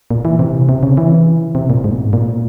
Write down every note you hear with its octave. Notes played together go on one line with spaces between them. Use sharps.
A#2
E3
C3
C3
C#3
E3
C3
A#2
G#2
A#2